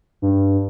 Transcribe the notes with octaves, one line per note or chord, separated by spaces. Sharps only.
G2